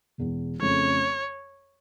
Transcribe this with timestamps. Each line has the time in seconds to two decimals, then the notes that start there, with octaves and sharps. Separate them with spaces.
0.18 E1 E2 E3
0.61 F2 C#3 F3 A3 C#4 C#5